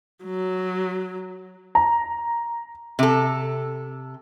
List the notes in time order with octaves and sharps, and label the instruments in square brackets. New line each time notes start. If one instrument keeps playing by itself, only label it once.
[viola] F#3
[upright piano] A#5
[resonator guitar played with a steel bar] C3 A4